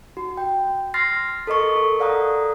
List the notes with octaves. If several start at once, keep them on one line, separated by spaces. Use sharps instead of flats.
F#4
G5
C6 F6 A6 A#6 C7
A4 A#4 D#5 C#6
A4 A#4
A4 D5 F5 F#5 A#5 D#6